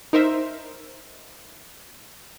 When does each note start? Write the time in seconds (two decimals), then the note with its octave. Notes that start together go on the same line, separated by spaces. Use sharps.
0.13 D#4 A#4 C5 E5